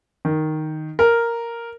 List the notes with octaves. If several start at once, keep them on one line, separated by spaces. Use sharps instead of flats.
D#3
A#4